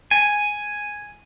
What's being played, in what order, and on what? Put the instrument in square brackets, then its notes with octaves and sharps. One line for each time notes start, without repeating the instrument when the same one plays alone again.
[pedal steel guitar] G#5